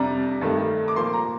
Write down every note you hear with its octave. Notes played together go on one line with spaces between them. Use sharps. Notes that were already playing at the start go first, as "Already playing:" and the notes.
Already playing: F2 C3 G3 D4 A#5
G2 D#3 A3
D6
A#2 F3 A#3 C6
A#5